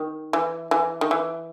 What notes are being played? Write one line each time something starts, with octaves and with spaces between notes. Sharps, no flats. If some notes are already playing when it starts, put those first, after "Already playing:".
Already playing: D#3
E3
E3
D#3
E3